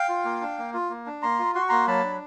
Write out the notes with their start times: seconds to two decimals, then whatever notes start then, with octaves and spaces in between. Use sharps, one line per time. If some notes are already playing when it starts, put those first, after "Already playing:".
Already playing: F5 G5
0.09 F4
0.25 A#3
0.41 D4
0.58 A#3
0.74 F4
0.90 A#3
1.06 D4
1.22 A#3 A#5 C6
1.39 F4
1.55 F#4 C6
1.62 C#6
1.69 A#3 A#5 C6
1.87 F#3 A5 B5
2.04 D4